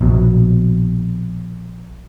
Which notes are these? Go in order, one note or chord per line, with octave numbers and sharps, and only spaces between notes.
A#1 B2